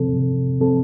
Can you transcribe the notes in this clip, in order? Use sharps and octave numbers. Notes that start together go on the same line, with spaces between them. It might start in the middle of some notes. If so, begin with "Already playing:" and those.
Already playing: C3 F3 C4 A4
C3
F3 C4 A4